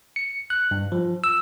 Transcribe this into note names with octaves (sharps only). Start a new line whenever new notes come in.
C#7
F#6
G2
F3
E6